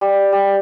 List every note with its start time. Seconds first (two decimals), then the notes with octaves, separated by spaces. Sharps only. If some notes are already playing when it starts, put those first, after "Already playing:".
0.01 G3
0.32 G3